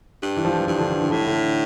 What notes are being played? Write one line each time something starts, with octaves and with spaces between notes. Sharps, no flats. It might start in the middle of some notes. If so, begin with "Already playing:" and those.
G2
E3
F3
F3
G2 E3
D3
D3
E3
A2 D3
D3